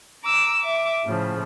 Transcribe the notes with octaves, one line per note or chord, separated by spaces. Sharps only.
A#5 D6 E6
E5 D6
A2 C#3 F3